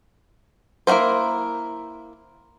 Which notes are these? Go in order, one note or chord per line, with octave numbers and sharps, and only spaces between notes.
A#3 E4 F#4 A#4 C5